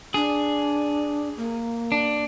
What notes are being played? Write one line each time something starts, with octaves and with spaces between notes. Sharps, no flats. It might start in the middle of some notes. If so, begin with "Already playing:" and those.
D4 G#4
A#3
D4